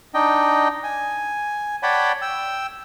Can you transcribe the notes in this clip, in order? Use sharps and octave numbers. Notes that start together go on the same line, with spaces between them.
D4 D#4 D#5 G5
G#5
C#5 D5 F#5 G5 A5 B5
G5 E6